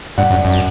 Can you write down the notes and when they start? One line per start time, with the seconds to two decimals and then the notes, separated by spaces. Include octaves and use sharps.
0.18 G2 D5 F#5
0.31 F#2
0.45 F#2